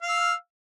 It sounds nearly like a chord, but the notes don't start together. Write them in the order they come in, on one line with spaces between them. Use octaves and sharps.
F5 F6 E6